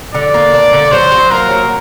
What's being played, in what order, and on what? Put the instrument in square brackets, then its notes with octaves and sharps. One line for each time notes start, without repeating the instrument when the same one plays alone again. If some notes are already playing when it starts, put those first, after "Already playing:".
[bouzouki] D3 [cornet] D5
[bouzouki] A#3
D4
D3
[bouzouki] F#3 [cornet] C5
[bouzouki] F#3
[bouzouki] A#3 [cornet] A#4
[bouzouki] F#3